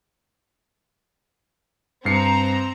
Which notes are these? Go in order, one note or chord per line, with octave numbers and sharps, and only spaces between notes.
G2 C4 A#5 C7 C#7